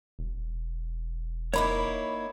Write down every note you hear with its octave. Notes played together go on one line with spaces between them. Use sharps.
E1
A#3 D#4 E4 C#5 B5 D6